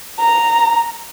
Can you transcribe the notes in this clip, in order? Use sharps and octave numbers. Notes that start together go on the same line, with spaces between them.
A#5